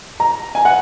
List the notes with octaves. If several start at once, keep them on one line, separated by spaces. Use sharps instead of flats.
A#5
G#5
F#5